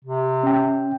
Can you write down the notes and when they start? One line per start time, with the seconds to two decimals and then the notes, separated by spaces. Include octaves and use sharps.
0.05 C3
0.43 C#4 G5